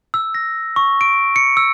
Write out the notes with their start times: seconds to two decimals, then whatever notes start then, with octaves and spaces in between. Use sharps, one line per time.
0.14 E6
0.35 A#6
0.76 C#6
1.01 D7
1.36 C#7
1.57 E6